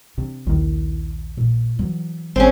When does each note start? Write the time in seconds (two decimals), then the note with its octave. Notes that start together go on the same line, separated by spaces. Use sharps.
0.18 C3 D4
0.47 A#1 D#2 D#3 E4
1.37 A#2
1.79 E3 F#3
2.36 G#1 C4 C#4